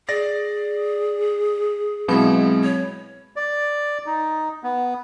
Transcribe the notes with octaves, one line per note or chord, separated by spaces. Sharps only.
G#4 D5 A6 A#6
B2 F#3 G#3 C4 E4 B5
C#5
D5
D#4
B3